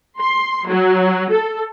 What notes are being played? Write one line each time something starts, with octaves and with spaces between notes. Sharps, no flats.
C6
F#3
A4